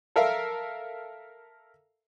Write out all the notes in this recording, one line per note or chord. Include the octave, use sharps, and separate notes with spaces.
A4 A#4 E5 F5